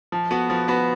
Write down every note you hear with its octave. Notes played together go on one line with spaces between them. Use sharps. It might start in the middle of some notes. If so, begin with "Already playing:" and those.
F3
B3 F#4 B4
F3
B3 F#4 B4